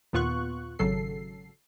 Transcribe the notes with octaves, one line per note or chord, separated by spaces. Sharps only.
D#2 A#2 B3 F4 C#6 F#6
G#1 C#3 F#3 A4 C7